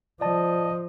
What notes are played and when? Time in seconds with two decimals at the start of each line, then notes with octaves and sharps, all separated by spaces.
0.21 F3 D5 D#5 A5